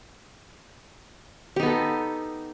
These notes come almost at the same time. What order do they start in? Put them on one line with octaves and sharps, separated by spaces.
G4 D#4 B3 A4